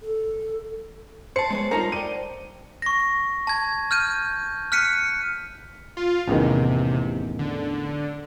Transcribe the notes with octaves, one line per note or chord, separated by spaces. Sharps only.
A4
C5 A5 C#7
G#3 B3 C#5
G3 D#4 F4 A#4 A#5 C#7
D5 G5 D#7
C#6 A#6
A5 G#6
F6 G6 D#7
F6 F#6 B6 C#7 D#7
F4
A1 E2 C3 D#3
D3